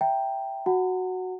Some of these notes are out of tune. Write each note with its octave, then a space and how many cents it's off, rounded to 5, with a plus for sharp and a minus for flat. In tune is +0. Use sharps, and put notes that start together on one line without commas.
E5 +10 G5 +0 A#5 +0
F#4 -5 F#5 +0 A#5 -40